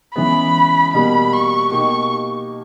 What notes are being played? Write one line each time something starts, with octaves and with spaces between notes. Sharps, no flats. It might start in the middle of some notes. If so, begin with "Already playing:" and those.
C#3 E3 G#3 B3 B5
B2 G3 A#3 B5
C#6
B2 A#3 D#4 G4 C#6